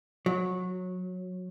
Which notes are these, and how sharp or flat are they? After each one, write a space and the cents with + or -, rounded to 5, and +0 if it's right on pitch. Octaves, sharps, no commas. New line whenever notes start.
F#3 -20